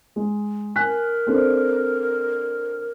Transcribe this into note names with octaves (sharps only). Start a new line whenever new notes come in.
G#3
A#4 G#5 F#6 B6
C4 D4 A4